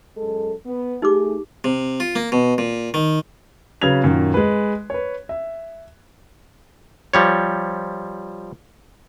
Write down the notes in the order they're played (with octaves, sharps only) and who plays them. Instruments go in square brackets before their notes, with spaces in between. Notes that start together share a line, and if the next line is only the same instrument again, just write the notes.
[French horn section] F#2 G#3 A4
B3
[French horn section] A3 G#4 [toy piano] D#4 G4 D6
[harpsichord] C3
F4
A#3
B2
A#2
D#3
[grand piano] C#3 F#3 B4 G#6 F7
F#2 A#2 D#3
G#3 B4
B4 C#5
E5
[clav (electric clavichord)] F3 G3 C#5